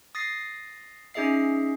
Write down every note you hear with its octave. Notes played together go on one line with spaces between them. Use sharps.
D#6 A6 A#6 C7
C#4 D#4 G#4 D#5 E5 C7